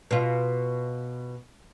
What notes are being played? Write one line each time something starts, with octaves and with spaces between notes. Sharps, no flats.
B2 F4